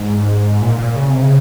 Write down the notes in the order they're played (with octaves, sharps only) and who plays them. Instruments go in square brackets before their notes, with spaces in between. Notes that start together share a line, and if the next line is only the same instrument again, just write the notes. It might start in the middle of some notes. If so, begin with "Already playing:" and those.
Already playing: [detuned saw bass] G#2
A#2
A#2
C#3
C3
C#3